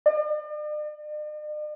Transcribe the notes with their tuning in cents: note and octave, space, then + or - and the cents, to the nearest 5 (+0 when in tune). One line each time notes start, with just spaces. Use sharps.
D5 +45